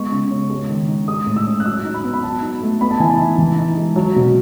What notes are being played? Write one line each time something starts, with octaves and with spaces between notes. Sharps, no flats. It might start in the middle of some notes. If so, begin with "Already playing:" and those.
Already playing: G#3 B3 C#6
C#3
C#4
G#3
D#3
D#4
G#3 D#6
A2
E6
C#4
F#6
F#3 E6
D#4
B5
B3
B5
F#3 A5
D#4
A3
B3 B5
A5
E3 G#5
A5
D#4
E3
D#4
G#3
F#3
B2